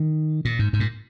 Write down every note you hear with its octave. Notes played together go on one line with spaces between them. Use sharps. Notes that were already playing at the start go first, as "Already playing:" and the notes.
Already playing: D#3
A#2
G#2
G#2
A#2